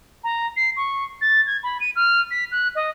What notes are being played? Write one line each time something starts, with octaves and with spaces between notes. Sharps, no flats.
A#5
C7
C#6
A6
G#6
B5
D#7
F6
B6
F#6
D#5